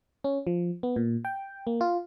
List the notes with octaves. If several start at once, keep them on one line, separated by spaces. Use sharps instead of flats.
C#4
F3
B3
A#2
G5
A#3
F4